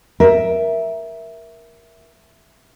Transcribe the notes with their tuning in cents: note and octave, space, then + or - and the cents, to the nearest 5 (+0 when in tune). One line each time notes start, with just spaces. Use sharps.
A#4 +15 E5 +0